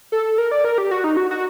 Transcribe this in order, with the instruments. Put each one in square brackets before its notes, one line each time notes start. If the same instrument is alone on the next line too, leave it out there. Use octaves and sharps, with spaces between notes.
[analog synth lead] A4
A#4
D5
A#4
G4
F#4
D#4
F#4
F#4